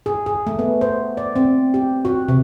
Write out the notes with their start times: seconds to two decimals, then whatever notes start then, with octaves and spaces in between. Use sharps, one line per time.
0.06 G#4
0.26 G#4
0.47 A3
0.59 B3
0.81 C5
1.17 D5
1.36 C4
1.74 G4
2.05 F#4
2.28 C3